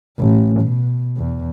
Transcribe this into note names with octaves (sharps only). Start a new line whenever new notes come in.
A1
B2
E2